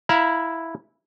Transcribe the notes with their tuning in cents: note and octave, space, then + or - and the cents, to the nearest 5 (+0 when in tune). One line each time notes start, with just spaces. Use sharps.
E4 +0 F5 +0 A#5 +30